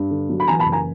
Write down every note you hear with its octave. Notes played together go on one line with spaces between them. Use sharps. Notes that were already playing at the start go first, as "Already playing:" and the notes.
Already playing: G2
D3
F#3
B5
E3 G#5 A#5
A5 B5
F#1
G#5 A#5